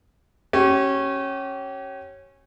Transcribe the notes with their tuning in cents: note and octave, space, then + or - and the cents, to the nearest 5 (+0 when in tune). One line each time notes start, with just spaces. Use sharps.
C#4 -15 G4 -40